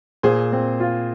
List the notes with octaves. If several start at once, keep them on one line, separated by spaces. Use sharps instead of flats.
A#2 G#4 C5
C4
F4